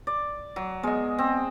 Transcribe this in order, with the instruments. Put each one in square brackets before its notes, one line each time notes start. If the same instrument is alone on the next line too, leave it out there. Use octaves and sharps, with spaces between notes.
[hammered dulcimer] D5
F#3
[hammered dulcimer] G#3 [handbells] B3 D#5
[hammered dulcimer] C4